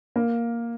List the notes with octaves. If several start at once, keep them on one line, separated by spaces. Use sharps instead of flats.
A#3